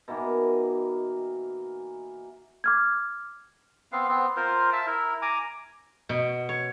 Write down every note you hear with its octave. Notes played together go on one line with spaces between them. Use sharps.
B2 D#3 E3 A#3
D6 F6 G#6
B3 C4 F5
B3 C4
F4 A#4 C5
E5 A5
E4 A#4
G#5 A#5 D6
B2
C#5